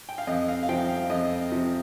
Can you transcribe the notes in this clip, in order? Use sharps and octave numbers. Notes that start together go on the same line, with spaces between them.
G5
F5
F2 D#5
F5
F5
C3 F3 G5
F5
F2 D#5
C3 F3